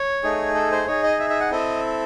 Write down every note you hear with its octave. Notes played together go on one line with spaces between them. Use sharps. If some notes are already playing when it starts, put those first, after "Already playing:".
Already playing: C#5
A3 D#4 G#4
A4
C5
D#4 G#4 C#5
D#5
E5
E5
F#5
C4 E4 A4 D#5